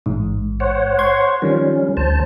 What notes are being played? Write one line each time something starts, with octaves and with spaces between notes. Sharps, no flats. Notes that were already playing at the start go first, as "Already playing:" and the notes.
A1 G#2
C5 C#5 F#5
C6 C#6 G#6
D#3 F3 G3 C#4
D2 C5 A5